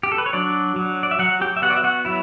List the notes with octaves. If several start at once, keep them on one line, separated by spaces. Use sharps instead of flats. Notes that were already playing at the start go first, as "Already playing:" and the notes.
G4
A4
B4
C#5
F#3 D4 D5
F#3
D5
E5
F#3 F#4 F#5
G4 G5
E5
B3 F#4 F#5
D5
E5
F#4 F#5
F#3 E4 E5